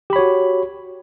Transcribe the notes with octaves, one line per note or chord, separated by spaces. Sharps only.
F#4 G4 C#5 B5